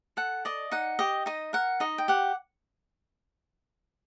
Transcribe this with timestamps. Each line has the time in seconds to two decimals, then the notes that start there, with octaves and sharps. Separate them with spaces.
0.17 A4 F#5
0.45 D5 D#5
0.71 D#4 F#5
0.99 G4 D#5
1.26 D#4 D#5
1.53 A#4 F#5
1.80 D#4 D#5
1.98 G5
2.08 G4 F#5